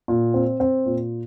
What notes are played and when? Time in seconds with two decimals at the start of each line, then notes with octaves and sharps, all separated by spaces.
0.08 A#2
0.34 C4
0.60 C4
0.86 A#2